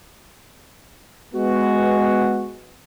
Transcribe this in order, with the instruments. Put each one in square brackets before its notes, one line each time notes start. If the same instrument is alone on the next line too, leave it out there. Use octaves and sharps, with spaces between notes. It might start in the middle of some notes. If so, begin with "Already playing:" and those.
[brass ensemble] G#3 B3 F#4